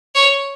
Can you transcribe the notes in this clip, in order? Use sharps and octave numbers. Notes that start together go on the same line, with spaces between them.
C#5